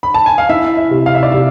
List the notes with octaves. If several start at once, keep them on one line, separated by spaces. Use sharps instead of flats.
B5
A5
G#5
F5
E4 E5
E5
C3
F5
E5
D5
C3 E5